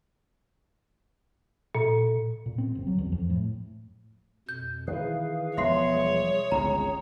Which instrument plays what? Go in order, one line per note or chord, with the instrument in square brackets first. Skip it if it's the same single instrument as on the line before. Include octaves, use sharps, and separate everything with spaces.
[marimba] A#2
[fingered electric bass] A#2
C4
G1
F#3
E2
F2
A2
[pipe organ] F2 B2 [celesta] G6
[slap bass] D#3 E3 [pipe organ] G#4 B4 F5
[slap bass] E1 F3 B3 [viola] C#5 [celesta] E5 C6 C7
[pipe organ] G3 G#4
[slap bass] G1 C#2 [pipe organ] C4 G#4 [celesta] A#5